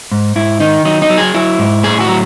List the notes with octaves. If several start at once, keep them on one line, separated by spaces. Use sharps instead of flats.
G#2
G#2 E4
D#3 D#4
F#3 D#4
D#4
F#3
G#4
F#3 E4
G#2
A2 G#4
F#4
F#3